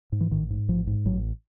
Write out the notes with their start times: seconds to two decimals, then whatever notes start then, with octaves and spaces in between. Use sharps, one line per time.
0.12 G#2
0.21 E3
0.31 A1 D#3
0.50 G#2
0.68 A1 F3
0.87 G#2
1.05 A1 F#3